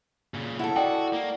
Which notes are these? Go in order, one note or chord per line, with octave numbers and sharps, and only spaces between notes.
A#2 C#3
E4 A4 F#5 B5
F#4 D5 D#5 G5
A#3